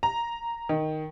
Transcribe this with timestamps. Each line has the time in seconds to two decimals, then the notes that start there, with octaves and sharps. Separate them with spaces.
0.03 A#5
0.69 D#3